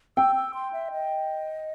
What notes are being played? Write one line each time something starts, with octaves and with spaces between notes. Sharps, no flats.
G5 E6
E6
C6
E5
D#5